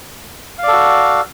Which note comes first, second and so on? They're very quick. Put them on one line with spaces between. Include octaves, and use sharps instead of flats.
F5 D5 A4 F#4